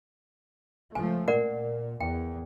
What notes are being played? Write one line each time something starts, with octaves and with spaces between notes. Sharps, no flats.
C#2 F3 A3 G#5
A#2 A#4 D5 F#5
E2 G5